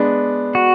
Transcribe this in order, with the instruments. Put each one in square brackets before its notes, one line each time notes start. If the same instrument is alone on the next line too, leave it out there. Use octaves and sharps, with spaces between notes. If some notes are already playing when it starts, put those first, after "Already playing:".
Already playing: [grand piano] G#3 B3 D4
[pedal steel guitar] F#4